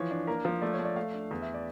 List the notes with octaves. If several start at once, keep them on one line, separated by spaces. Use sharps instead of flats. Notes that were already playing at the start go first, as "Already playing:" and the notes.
Already playing: E3 F3 C#5
D4
A#3 A#4
F3
A3 D5
C#5
A3
D5
A3 F5
D4
E2
E5
D5